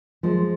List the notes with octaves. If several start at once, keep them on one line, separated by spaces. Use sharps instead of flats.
F3 G#3